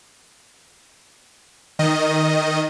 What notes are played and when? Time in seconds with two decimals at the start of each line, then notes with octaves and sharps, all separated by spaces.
1.79 D#3 D#5